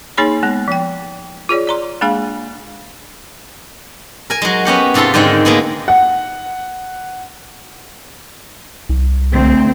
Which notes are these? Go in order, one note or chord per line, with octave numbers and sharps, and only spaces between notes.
A#3 D#4 G#4 C#5 B5
G#3 B3
F3 G5
F4 G#4 C#5 D5
D5 A#5 C6
G#3 A#3 D4 G#4 F5
A#4 G#5
F#3 G#3
B3 C#4 G4 F#5
G#2 C3 F4 A4 C6
G#2 D3 D#3 G#3 C4
G#3 A#3 B3 G#4
F#5
C2
D2 C4